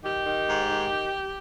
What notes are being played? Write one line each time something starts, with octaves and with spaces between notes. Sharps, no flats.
D#3 G4
D#3
G#2
D#3